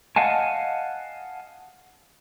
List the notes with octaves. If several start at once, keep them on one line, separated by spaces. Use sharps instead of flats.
D#5 F5 F#5 G#5 A5